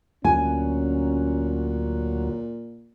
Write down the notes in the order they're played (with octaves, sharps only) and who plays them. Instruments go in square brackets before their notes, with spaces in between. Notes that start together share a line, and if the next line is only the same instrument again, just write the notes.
[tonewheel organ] D2 F#3 [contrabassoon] A#2 [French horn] C#4 [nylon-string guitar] G#5